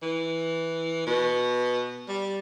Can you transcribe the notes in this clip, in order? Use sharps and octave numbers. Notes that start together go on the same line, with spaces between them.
E3
B2
G3